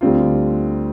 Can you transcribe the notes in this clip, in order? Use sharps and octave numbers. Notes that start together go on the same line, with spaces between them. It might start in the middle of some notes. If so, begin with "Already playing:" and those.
D2 D3 G3 C4 F4